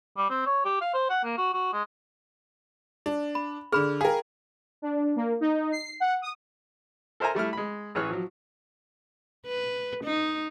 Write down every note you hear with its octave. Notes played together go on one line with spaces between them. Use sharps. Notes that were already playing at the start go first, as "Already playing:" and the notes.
G3
C4
C#5
G4
F5
C5
F#5
A#3
F#4
F#4
G#3
D4
B5
D3 G#4 B5 F6
G#4 A#4 F5 G5
D4
A#3
D#4
C7
F#5
D#6
A4 A#4 C5 E5 G#5 A#5
G3 A3 E4 F6
G#3 B5
A1 E3 G#4 C#5 F6 F#6
F3 F#3
B4
D#4